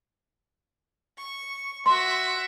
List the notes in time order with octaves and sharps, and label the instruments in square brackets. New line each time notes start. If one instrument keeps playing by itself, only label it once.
[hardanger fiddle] C#6
[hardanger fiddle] F#4 E5 [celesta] C6